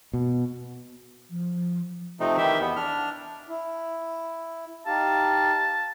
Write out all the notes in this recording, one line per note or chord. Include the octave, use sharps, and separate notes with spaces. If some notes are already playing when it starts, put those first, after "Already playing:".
B2
F3
C3 F3 A3 C4 D#4
D#3 E3 G4 E5
E2 B3
D4 F6
E4
D#4 G4 F5 A5